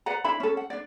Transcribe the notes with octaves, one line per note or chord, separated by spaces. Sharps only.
B4 D5 F#5 A#5
D4 E4 E5 B5
C#4 A4
F#5
D4 D5